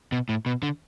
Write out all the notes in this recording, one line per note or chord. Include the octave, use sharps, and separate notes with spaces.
B2
A2
B2
D3